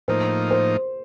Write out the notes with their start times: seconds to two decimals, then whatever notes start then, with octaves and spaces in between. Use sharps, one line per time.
0.08 A2 F3 A#3 D#4 C5
0.51 C5